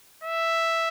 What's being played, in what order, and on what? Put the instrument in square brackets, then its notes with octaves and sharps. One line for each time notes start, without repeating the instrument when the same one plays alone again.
[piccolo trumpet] E5